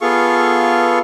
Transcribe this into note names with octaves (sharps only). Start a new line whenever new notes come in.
B3 F4 G#4 A4 F5 C#6